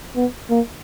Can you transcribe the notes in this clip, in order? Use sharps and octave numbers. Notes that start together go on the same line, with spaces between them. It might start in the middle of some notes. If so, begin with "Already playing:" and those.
B3
A#3